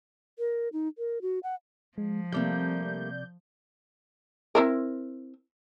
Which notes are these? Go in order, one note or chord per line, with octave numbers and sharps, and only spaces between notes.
A#4
D#4
A#4
F#4
F#5
F3 G#3
C3 G3 A3 A#3 D5 F5 G6
C4 E4 A#4